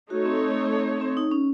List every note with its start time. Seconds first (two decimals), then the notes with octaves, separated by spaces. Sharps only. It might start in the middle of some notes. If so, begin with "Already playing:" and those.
0.10 A3 D#4 F#4 A4 C#5
0.25 C4
1.01 C4
1.17 D#4
1.31 C#4